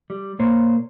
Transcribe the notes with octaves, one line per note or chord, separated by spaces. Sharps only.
G3
A#2 A#3 C5 C#5